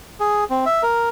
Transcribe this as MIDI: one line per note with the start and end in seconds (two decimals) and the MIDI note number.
0.20 0.44 68
0.50 0.65 60
0.66 0.83 76
0.83 1.09 70